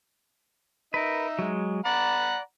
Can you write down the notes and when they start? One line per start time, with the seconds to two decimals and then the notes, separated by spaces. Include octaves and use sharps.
0.94 D#4 A#4 B4 E5
1.39 F#3 G#3
1.85 D5 F#5 A#5 B5